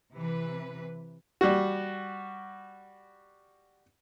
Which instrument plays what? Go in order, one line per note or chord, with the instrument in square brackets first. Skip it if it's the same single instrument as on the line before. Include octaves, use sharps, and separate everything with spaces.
[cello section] C3 E3 B4
[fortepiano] G3 F#4